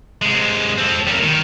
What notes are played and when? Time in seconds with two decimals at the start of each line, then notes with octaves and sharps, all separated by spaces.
0.22 C3 G#3
0.78 C4 A4
1.07 G3 A#4
1.23 D#3